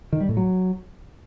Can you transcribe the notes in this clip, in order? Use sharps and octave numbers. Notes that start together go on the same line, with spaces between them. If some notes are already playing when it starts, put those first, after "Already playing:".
D#3
G3
A2
F#3